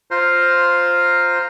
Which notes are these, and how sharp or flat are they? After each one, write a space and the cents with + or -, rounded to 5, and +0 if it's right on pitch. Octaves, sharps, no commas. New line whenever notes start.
F4 +0 C5 +0 A#5 -5